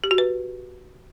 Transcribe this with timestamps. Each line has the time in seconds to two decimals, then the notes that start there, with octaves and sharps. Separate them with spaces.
0.04 G4
0.11 F#4
0.18 B4